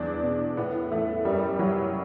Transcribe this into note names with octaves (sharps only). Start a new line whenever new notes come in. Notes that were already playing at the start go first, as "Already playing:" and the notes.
Already playing: E2 D4
B2
A2 B3
E3 A3
F#2 G3
E3 F#3